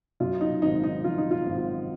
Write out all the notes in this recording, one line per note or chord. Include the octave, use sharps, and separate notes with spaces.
F#2 F4
D#4
G#1 D#4
D#4
F3 F4
D#4
F4
G#1